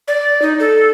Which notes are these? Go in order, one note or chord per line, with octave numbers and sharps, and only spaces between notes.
D5
D#4
A4